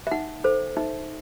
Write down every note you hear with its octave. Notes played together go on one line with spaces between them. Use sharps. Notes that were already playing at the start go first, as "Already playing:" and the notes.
E5
D#4 F#5
A4 C5
D#4 E5